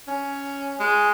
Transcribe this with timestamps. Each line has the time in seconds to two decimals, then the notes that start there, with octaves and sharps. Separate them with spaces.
0.08 C#4
0.79 G#3